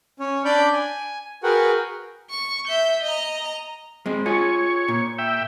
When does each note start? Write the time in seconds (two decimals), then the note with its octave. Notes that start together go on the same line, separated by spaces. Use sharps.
0.20 C#4 C#5
0.45 D4 D5 B5 D6 G6
0.73 G#5
1.43 F#4 G#4 A#4 B4 F#5 G5
2.30 C#6
2.67 E5 G6
3.03 D#5 A#5
4.06 G#3 C4
4.26 F4 G#4 C#5
4.88 A#2
5.18 E5 G5